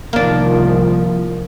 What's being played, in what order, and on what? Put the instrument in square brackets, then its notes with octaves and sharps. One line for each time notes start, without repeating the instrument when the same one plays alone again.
[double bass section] C2 D#3 F3 [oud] A#3 D4